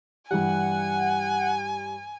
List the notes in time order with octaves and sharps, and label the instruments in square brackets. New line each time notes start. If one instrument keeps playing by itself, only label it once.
[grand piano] G2 E3 G3 [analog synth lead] F#5 [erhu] G#5